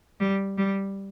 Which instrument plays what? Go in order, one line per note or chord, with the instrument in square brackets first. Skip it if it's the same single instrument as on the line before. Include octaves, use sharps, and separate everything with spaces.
[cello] G3
G3